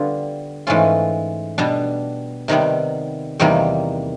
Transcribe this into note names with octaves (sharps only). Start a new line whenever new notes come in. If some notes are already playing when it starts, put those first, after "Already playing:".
Already playing: D3 G3 B3 D4 F4
G#2 E3 A3 C#4 F4
B2 G3 B3 D4
C3 D#3 G3 B3
E2 C3 D#3 G3 A#3